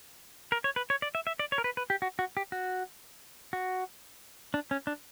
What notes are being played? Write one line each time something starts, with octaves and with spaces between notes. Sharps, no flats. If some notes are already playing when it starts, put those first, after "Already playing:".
A#4
C#5
B4
C#5
D5
E5
E5
D5
C#5
A#4
B4
B4
G4
F#4
F#4
G4
F#4
F#4
D4
C#4
D4